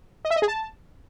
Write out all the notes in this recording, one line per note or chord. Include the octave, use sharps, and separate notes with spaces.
D#5
E5
D#5
G#4
A5